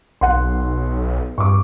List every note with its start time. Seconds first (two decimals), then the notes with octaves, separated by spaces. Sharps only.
0.21 B1 F#5 C6
1.38 G2 C#6 D6